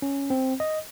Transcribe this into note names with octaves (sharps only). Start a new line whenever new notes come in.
C#4
C4
D#5